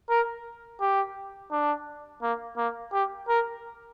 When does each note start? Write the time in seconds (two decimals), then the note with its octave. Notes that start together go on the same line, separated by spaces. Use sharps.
0.10 A#4
0.81 G4
1.51 D4
2.22 A#3
2.57 A#3
2.93 G4
3.29 A#4